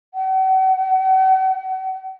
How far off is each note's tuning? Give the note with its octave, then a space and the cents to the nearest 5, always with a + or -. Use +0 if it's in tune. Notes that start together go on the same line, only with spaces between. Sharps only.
F#5 +40